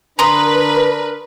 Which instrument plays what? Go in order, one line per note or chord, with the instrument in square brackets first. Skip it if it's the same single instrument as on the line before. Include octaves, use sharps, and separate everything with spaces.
[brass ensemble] D3 D4 A#4 [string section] B4 [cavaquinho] A#5 C6 D#6